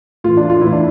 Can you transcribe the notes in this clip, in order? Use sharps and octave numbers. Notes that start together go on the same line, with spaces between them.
A2 E3 F4
D4
F4
A2 E3 E4
D4